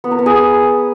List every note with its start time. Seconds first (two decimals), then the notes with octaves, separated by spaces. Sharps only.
0.04 B3
0.11 A#4
0.19 B3
0.26 G#4